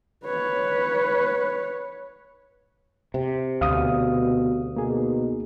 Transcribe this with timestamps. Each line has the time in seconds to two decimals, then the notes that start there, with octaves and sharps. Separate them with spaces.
0.25 B4 C#5
3.14 C3
3.61 D2 B2 F5 D#6
4.76 B2 A#3 D#4 G#4